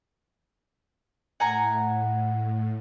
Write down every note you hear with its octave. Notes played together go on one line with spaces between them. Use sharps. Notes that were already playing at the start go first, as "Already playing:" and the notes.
A2 F#5 G#5 A#5